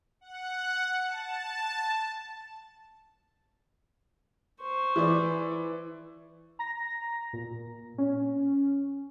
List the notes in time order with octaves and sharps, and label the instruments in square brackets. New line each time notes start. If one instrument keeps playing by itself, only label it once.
[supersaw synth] F#5
A5
[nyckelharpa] C5 C#6
[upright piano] E3 D5
[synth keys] A#5 A#6
A#2
C#4